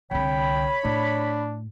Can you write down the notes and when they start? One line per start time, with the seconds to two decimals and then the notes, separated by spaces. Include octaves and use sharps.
0.11 C2 D3 C#5 G5 B5
0.85 A2 D4